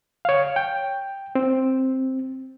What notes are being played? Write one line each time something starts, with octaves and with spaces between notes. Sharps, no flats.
C#5 F5
G5
C4